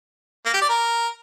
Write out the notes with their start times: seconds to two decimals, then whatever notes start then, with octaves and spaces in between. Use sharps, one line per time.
0.46 A#3
0.54 G4
0.62 D5
0.69 A#4